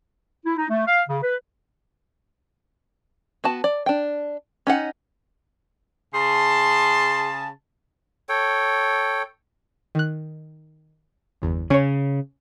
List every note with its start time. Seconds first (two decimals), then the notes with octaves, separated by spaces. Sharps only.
0.46 E4
0.57 D#4
0.69 A3
0.87 F5
1.08 C#3
1.23 B4
3.44 B3 F#4 A5
3.64 D5
3.86 D4 G5
4.67 C#4 D#4 F#5
6.15 C#3 G#4 A5 C6
8.29 A4 C#5 G5
9.95 D#3 F#6
11.42 G1 E2
11.70 C#3 C#4 C#5